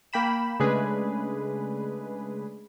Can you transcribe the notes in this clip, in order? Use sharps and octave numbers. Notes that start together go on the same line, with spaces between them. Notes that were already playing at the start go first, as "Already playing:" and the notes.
A#3 G5 B5 E7
C#3 G#3 A3 D4 G#4 B4